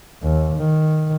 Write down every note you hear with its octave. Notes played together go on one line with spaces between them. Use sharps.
D#2
D#3